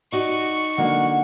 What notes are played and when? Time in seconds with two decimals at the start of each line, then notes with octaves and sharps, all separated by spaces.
0.12 D#4 F#4 D5 C#6
0.78 D3 F#3 A#3 F#5